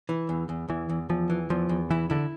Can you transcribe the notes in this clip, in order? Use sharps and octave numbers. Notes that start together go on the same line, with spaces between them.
E3
E2
E2
E2 E3
E2
E2 F3
E3
E2 F3
E2
E3 E4
D3 E4